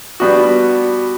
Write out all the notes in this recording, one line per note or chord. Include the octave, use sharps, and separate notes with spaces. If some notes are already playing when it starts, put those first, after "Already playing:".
G3 B3 D4 F#4